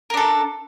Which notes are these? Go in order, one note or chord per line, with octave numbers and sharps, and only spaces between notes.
D4 A4 A#4